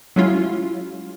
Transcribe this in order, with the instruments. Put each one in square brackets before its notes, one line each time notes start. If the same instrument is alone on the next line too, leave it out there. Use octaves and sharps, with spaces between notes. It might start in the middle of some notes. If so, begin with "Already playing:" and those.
[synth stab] F#3 G#3 C#4 E4 F4